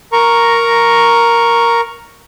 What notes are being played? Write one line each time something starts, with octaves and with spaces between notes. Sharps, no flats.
A#4 A#5 C#6